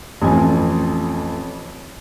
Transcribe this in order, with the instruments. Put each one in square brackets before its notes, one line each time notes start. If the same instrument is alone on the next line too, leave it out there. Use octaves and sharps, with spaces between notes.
[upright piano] A1 F2 G#5